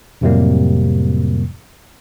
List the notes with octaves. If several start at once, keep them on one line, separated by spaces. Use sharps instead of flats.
F2 A2 C3 F#3 G3 A#3